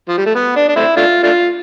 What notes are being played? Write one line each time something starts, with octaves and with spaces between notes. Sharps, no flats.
F3
G3
A3
B3
D4
D4
A3 C4 E4
A3 D4 F4
A3 D4 F4